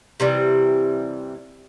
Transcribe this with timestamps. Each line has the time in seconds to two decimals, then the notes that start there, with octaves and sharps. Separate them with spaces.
0.20 C3 E3 G3